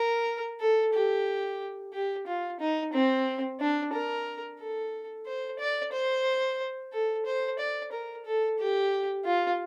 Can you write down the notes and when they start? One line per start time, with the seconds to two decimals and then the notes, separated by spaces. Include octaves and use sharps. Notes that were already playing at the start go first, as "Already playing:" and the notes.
Already playing: A#4
0.60 A4
0.93 G4
1.93 G4
2.27 F4
2.60 D#4
2.93 C4
3.60 D4
3.93 A#4
4.60 A4
5.26 C5
5.59 D5
5.92 C5
6.92 A4
7.26 C5
7.59 D5
7.92 A#4
8.25 A4
8.59 G4
9.25 F4